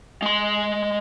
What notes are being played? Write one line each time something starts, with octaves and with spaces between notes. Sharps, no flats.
G#3 C6